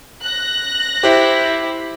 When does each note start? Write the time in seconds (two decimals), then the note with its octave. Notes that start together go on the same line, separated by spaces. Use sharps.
0.21 F#6 A#6
1.03 E4 G4 C5